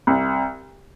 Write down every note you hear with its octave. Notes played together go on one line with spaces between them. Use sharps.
C2